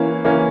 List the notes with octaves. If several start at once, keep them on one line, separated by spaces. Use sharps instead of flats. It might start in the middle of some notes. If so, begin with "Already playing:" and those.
Already playing: E3 A#3 C#4
E3 A#3 C#4